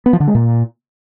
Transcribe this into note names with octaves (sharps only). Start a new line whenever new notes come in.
B3
F3
D3
G#3
A#2